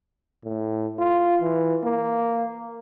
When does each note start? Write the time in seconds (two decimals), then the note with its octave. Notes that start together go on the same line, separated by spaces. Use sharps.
0.44 A2
0.99 F4
1.41 E3
1.83 A#3